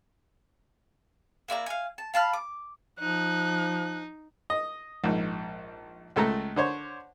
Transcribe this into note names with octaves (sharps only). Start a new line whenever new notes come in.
A#3 E4 D5 A#5
F5 G#5
A5
F5 A5 B5 F6
D6
F3 D#4 F#6
D#5
A#1 G#2
C#2 A3 A4 A#5
D3 C5 C#5